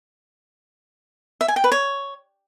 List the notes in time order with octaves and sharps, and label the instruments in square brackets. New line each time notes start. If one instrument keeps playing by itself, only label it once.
[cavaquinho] E5
G#5
G5
B4
C#5